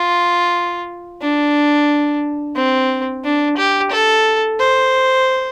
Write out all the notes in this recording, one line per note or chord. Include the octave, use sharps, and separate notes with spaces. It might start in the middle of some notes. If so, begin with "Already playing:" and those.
Already playing: F4
D4
C4
D4
G4
A4
C5